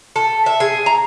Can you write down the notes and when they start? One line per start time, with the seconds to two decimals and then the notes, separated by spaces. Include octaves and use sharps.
0.16 A4
0.46 E5
0.60 G#4
0.86 A#5